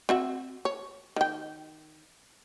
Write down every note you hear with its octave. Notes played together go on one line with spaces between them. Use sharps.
C4 F#4 E5
C#5
D#3 G5